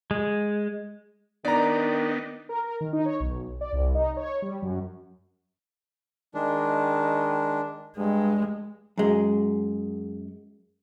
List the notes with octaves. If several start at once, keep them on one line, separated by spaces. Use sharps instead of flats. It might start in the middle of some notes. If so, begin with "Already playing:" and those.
G#3
D#3 B3 D4 D#4 D5 A#5
A#4
A#4
D#3
D#4
C#5
B1
D5
C2
D#4
C#5
G3
F#2
D#3 G#3 D4
G2 G#3
F#2 G#3